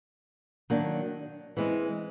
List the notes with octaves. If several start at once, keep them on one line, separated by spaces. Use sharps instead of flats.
D#3 F#3 A#3 D4
E3 G#3 C4